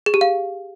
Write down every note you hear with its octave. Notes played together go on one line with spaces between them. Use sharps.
G#4
G4
F5